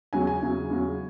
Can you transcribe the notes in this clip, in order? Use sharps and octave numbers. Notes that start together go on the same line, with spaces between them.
E2 C#3 F#3 G#5
G#5
E2 C#3 F#3
E2 C#3 F#3